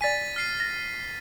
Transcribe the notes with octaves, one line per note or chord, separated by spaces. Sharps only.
D5 G#5 A6 B6 D#7
F6 C7 D#7
A#6